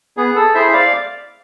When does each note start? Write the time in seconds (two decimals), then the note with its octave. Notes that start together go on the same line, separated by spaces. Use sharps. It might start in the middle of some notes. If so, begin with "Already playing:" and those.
0.17 B3 G#4
0.36 A4
0.54 E4 G#4 C5 E5
0.73 D5 F5